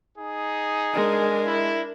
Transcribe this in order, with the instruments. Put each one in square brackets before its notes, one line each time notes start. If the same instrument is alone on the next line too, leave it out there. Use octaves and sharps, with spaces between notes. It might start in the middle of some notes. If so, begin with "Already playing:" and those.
[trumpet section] D#4 G#4
[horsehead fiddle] G#3 [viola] D4 A#4
[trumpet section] E4